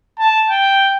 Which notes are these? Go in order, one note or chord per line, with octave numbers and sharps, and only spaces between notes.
A5
G5